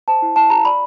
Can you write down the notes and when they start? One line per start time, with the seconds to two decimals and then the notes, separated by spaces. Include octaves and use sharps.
0.08 C5 A5
0.22 E4
0.36 E4 A5
0.50 G4 A#5
0.65 D5 B5